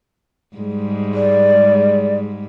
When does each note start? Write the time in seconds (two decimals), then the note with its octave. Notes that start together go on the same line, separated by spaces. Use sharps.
0.57 G#2 G3 G#3
1.13 D5